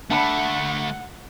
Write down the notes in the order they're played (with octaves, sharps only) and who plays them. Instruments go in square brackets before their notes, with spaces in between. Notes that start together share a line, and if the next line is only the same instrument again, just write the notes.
[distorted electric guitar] D3 A3 [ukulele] D4 A5 B5 [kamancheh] F#5